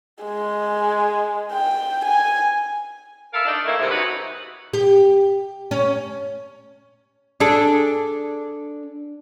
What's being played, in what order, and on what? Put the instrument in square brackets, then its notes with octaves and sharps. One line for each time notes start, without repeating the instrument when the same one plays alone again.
[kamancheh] G#3
G5
G#5
[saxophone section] A4 A#4 E5 F5
D4 D#4
E3 A3 A#3 E4
D#2 G#2 C3
C#4 D#4 F#4 B4
[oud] G4
C#4
D4 G#4 A4